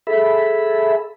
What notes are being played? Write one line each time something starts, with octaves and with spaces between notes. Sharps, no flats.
G#4 A4 E5 B5